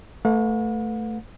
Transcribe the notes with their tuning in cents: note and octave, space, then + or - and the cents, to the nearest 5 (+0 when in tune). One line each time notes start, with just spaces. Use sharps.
A3 +5 B4 +0 F#5 -45